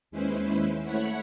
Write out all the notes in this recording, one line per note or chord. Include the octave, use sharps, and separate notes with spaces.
D#2 G#3 C#4 E4 B4 C5
A3 E4 C#5 F#5 B5